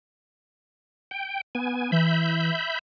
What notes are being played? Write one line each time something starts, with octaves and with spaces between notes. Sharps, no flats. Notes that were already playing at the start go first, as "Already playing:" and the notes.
G5
B3 G#5
E3 E5 B5 G6